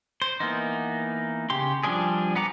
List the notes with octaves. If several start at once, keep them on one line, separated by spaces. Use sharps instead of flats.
C5
E3 A#3 B3 D#4
C#3 G4 C6
F3 G3 D4 G#4
B3 F#5 A#5 D6